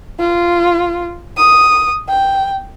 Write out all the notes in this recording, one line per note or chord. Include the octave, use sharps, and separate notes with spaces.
F4
D#6
G5